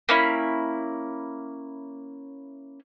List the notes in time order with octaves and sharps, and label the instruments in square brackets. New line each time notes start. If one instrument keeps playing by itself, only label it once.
[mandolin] A#3 C#4 E4